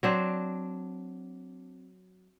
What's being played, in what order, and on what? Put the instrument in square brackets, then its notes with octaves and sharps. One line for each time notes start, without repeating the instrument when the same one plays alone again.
[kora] F#3 C4 D4 C5